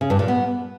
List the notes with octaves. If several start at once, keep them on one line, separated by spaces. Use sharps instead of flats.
C#3
G2
A#2
B3